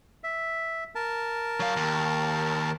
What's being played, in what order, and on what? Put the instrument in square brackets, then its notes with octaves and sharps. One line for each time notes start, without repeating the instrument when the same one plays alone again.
[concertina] E5
A#4 A5
[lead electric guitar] F#3 F5
D#2